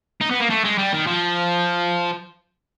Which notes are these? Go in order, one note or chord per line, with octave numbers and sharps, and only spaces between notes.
D#4
B3
A#3
A3
G#3
G3
D#3
F3